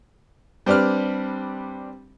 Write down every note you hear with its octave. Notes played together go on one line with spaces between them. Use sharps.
G3 C4 D4 B4 F6